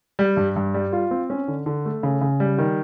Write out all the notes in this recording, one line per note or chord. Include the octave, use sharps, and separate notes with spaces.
G3
G2
G2
G3
F4
C4
C#4
D3
D3
A3
C#3
C#3
G3
D#3